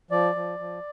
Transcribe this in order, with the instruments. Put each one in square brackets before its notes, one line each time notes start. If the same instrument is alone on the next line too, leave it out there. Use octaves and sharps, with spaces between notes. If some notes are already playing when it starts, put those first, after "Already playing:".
[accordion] F3 D5
F3
F3